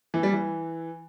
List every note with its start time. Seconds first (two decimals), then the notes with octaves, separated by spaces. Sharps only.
0.14 E3
0.23 G3
0.33 E3